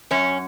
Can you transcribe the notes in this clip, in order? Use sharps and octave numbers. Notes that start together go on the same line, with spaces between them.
F#2 C#4